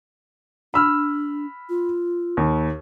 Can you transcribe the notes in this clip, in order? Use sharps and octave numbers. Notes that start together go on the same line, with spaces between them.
D4 B5 E6 F6
F4
D#2